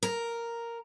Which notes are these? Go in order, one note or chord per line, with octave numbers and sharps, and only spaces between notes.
A#4